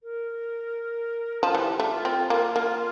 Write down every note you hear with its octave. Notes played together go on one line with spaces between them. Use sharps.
A#4
F3 F4
E3 G4
A3
F4
C4
A#3 F4
A#3